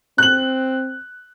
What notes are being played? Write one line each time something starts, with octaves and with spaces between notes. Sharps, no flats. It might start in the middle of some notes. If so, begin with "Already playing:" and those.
C4 F#6 F#7